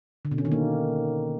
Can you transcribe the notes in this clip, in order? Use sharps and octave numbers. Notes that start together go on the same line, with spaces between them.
D3
B2
C#4
D#3
A#3